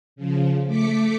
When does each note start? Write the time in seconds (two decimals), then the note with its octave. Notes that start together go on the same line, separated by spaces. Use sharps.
0.16 C#3 F3
0.66 A3 D6 B6 C#7